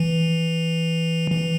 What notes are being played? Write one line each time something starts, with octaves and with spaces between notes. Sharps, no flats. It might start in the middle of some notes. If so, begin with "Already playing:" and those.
Already playing: E3
E3